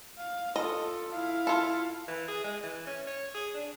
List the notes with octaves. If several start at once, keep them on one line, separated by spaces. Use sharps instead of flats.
F5
F4 A4 D#5
E4 F5
F4 A4
E3
G#4
G#3
E3
C#4
C#5
G#4
D4